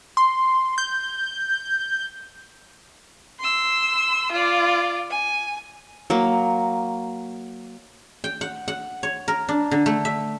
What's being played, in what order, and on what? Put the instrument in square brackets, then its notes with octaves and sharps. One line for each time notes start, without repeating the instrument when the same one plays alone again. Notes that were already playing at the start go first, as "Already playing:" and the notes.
[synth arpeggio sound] C6
G6
[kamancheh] C6 E6
F4 D5
G#5
[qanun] F#3 A#3
[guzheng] G5
F#5
F#5
C#5
A#4
D4
D3
A3
E5